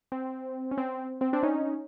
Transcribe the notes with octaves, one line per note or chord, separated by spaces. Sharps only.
C4
C#4
C4
C4
C4 D4
C#4 D#4